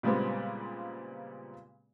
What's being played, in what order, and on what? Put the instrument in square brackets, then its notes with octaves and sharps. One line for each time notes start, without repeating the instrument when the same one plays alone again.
[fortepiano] A#2 C#3 G3 G#3 B3 C4